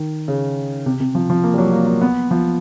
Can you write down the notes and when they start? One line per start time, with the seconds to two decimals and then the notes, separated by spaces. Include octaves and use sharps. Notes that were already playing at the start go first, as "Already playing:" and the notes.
Already playing: D#3
0.28 C#3
0.86 C3
1.00 C3
1.15 F3
1.30 F3
1.44 A#3
1.54 G3
1.58 F#3
1.73 A#3
1.87 A#3
2.02 B3
2.31 F3